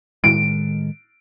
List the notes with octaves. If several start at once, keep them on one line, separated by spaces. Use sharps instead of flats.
A2 D#3 G#3 D7